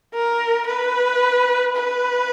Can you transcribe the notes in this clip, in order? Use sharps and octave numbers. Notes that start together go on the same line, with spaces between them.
A#4
B4
B4